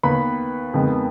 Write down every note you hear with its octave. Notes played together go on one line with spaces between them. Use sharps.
D#2 D#3 B3 B4 B5
F2 D#3 G#3 B3